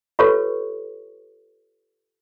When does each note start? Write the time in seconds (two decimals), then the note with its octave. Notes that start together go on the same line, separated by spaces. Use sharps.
0.19 F4 G4 A4 B4 C#5 C#6